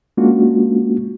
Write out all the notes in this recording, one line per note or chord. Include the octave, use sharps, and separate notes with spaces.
G#3 A#3 C#4 D4 F4 F#4